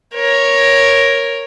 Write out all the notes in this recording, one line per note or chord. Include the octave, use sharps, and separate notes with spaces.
A#4 C#5